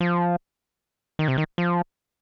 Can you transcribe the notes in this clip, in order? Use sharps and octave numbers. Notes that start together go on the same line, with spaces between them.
F3
D#3
C3
D#3
F3